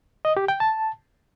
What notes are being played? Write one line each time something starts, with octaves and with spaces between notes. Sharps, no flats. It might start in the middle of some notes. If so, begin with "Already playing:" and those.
D#5
G4
G5
A5